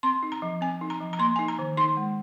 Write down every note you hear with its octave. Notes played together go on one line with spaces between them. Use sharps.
C4 C6
D#4
A#5
F3
C4 G#5
D#4
A#5
F3
A#5
A#3 C6
D#4 G#5
A#5
D#3
D#4 C6
G#3